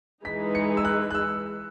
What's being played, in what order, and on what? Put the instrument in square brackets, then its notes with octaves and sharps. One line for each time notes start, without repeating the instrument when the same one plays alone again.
[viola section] E3 G#3 D#4 G#4 B4 [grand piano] B6
[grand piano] C#7
E6
F#6
F#6
E6